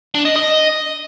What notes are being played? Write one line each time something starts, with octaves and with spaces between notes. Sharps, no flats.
D4
D#5
D#5